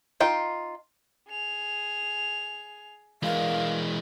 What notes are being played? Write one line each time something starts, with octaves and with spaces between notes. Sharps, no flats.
D#4 F4 G5
G#4 F7
E3 G#3 A#4 D5 F5